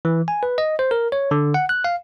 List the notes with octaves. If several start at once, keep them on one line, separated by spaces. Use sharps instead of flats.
E3
G#5
B4
D#5
C5
A#4
C#5
D3
F#5
F#6
F5